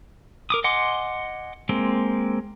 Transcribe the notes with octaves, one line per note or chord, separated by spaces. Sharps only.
A#4 D6 D#6
D#5 F#5 G#5 C6 D6
G#3 A#3 C4